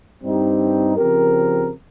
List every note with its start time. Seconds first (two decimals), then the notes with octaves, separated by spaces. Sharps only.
0.22 G2 G3 C4 D#4 G4
0.97 C#3 F3 C4 G4 A#4